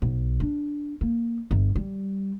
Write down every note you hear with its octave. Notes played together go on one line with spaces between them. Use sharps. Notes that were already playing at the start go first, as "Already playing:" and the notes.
B1
D4
A#3
G1
G3